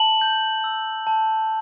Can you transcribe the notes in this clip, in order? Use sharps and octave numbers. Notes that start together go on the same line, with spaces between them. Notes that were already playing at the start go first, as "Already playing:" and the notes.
Already playing: A5 F#7
G6
E6
A5